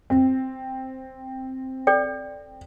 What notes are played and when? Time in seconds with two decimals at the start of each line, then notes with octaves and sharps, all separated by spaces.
0.10 C4
1.87 A4 D5 G5